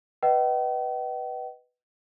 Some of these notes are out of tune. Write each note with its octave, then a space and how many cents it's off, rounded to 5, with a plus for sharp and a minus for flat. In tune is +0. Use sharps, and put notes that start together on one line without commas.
B4 +0 D#5 +0 G5 -45